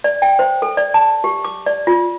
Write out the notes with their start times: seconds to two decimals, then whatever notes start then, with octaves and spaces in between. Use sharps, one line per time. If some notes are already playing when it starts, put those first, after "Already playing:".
0.04 D5
0.22 G5
0.39 C5
0.62 A4
0.77 D5
0.94 A5
1.24 G4
1.45 D6
1.66 D5
1.87 F4